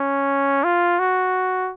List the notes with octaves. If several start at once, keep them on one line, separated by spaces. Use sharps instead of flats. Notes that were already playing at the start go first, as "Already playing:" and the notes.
Already playing: C#4
F4
F#4